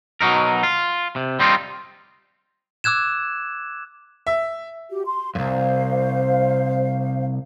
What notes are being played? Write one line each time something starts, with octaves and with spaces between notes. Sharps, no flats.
B2 F#3 D#4 A#4
F4
C3
G3 C4 D#4 F4
D6 E6 F#6 G#6 E7
E5
F#4 G4
C6
C2 F#2 C5 F5